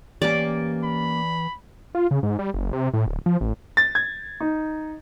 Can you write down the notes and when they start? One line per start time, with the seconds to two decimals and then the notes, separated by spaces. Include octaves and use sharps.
0.22 E3 A#3 C#4 G4 D5
0.84 B5
1.95 F4
2.11 C#3
2.23 G#2
2.39 G3
2.54 F#1
2.73 C3
2.94 A2
3.07 D1
3.26 F3
3.41 A1
3.77 A6
3.95 G#6
4.40 D#4